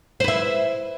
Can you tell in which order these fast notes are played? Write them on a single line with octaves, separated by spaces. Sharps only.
C5 B4 E4